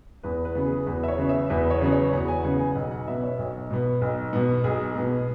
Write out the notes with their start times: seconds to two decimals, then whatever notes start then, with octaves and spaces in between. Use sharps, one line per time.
0.23 E2 B4
0.45 B4
0.55 C#3 F#3 B3
0.65 G#4
0.87 E2 B4
1.03 E5
1.08 C#5
1.18 C#3 F#3 B3
1.29 E5
1.50 E2 B4
1.70 C#5
1.81 C#3 F#3 B3
1.92 C#5
2.13 E2 F#5
2.28 G#5
2.44 C#3 F#3 B3 F#5
2.59 G#5
2.75 B1 F#5
2.91 F#5
3.07 B2 B3 E5
3.23 C#5
3.39 B1
3.71 B2 B3
4.01 B1
4.33 B2 B3
4.64 B1 G#4
4.96 B2 B3